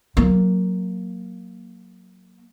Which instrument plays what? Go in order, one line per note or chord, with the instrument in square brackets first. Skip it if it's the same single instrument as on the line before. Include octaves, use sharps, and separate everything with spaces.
[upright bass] F#3 A#3